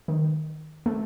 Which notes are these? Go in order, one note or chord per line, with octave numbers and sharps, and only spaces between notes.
D#3
A3